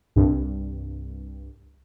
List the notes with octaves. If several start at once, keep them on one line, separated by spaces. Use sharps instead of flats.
C2 G2